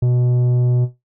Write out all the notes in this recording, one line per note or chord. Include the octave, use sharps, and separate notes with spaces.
B2